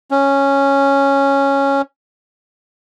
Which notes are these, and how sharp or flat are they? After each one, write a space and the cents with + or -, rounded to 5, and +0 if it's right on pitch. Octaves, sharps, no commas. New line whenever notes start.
C#4 -5